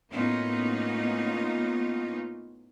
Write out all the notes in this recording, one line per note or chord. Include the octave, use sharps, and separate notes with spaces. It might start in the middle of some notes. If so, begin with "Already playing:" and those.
A2 A#3 B3 C#4 D#4 F4